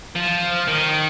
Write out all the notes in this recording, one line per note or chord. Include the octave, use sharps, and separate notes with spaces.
F3
D#3